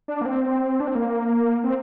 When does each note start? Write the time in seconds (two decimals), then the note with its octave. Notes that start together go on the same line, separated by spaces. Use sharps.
0.08 D4
0.21 A#3
0.26 C4
0.80 D4
0.88 C4
0.95 A#3
1.64 C4